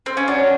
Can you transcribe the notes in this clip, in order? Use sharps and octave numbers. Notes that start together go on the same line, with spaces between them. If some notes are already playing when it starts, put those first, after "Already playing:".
C4
C#4
F#3 D4